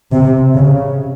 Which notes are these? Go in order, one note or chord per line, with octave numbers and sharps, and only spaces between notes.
C3
C#3